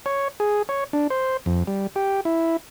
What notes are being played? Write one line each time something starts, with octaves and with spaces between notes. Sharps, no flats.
C#5
G#4
C#5
D4
C5
F2
G3
G4
E4